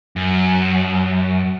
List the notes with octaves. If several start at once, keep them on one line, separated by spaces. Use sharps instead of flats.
F#2